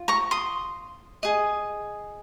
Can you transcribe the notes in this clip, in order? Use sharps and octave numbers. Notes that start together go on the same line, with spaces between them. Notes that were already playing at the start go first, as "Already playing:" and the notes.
Already playing: F4
A#5 C#6
C6 D#6
G#4 D#5